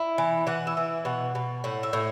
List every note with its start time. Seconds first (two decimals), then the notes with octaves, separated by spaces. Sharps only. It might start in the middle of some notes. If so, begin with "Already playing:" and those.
Already playing: E4
0.18 E3
0.47 E3 F#5
0.67 E5
0.77 E3
1.05 B2 F#5
1.35 B2
1.64 A2 F#5
1.83 E5
1.93 A2